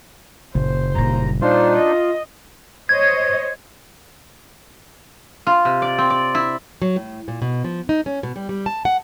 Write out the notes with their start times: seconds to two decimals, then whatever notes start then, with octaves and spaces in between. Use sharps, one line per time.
0.55 F#1 A#2 C5
0.95 D#2 A#2 G3 A#5
1.42 D4 D#4 F4 C5
1.78 D#5
2.89 C5 C#5 D#5 G#6
5.47 F4
5.65 C3
5.82 D5
5.98 C4
6.10 D5
6.35 E4
6.82 F#3
6.96 A2
7.28 A#2
7.42 B2
7.64 F3
7.89 D#4
8.06 C#4
8.23 B2
8.36 G3
8.49 G3
8.66 A5
8.85 F#5